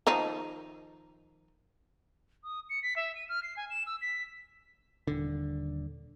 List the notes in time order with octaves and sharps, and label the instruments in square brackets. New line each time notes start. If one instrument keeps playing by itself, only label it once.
[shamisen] D#3 F3 D#4
[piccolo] D#6
C#7
B6
E5
D#7
F6
C7
G#5
E7
E6
B6
[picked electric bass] D#1 D3